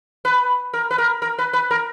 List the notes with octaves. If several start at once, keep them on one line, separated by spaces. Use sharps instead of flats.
B4
A#4
B4
A#4
A#4
B4
B4
A#4